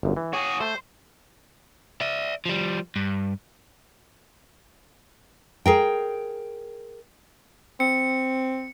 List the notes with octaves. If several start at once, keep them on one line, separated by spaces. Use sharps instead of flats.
G1 F#2
E3
F#4 G#4 C#5
A3 C5
D5 E5
F3 G3
G2
G#4 A#4 G5
C4 C#7